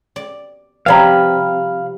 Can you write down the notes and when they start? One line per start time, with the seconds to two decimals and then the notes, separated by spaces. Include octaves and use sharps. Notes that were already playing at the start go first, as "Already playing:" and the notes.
0.16 D5
0.86 C3 F3 G3 B4 D5 F5 A#5 B5